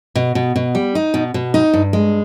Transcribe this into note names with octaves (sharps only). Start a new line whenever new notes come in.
B2
B2
B2
G3
D#4
B2
B2
D#4
G2
G#3